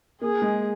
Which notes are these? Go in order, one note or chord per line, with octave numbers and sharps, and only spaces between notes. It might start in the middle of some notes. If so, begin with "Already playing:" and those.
A#3 G#4
G#3